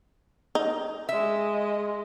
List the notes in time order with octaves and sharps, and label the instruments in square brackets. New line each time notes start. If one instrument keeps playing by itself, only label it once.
[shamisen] D#4
[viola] G#3 D#5 [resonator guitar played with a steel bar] E5